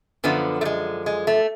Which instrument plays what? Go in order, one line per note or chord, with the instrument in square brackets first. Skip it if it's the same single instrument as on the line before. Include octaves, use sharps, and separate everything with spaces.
[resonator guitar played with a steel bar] F#2 D3 F3 B3
A3
G#3
G#3
A3